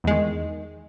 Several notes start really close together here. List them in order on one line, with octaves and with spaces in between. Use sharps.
E2 G#3 D#3